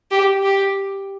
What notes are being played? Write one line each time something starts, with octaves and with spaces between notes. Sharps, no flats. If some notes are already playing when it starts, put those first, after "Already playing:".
G4
G4